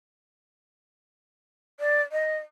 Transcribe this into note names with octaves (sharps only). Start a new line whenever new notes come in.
D5
D#5